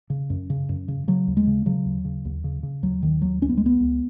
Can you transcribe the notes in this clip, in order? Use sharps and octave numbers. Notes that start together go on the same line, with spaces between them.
C#3
F#2
C#3
F#2
C#3
C#3 F#3
D#2
G#3
C#3
C#3 F#3
D#2
C#3
D#2
C#3
C#3
D#2 F#3
D#2 D#3
D#2 F#3
C#2 C#4
B3
G#3
C#2 B3
C#2